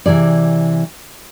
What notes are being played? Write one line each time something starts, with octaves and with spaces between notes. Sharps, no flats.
C3 E3 G#4 D5